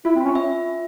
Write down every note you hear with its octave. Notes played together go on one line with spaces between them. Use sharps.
E4 F4
C4
C#4
E5